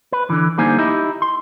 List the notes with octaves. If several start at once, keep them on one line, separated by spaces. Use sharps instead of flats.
B4
D3 E3
D3 G3 A#3 D#4 C5 G#5
D#4 E4 G4 D#5
C6